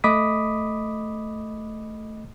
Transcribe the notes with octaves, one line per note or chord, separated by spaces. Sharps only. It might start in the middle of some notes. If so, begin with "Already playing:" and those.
A3 D#5 B5 D6 D#6 B6